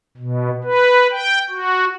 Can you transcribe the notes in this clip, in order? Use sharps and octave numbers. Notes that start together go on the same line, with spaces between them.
B2
B4
G5
F#4